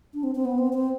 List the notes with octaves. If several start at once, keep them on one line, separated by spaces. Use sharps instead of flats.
D4
C4
C4
B3
C4
C4